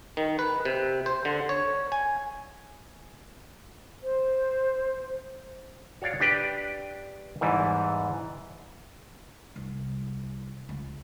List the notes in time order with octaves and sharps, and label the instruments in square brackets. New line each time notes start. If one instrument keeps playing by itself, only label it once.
[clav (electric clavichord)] D#3
B4
C3
C5
D3
C#5
G#5
[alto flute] C5
[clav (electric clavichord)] F#4 C#5 D5 F5
D4 G4 B4 G5
E2 G#2 E3 G3
[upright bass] C2
C#2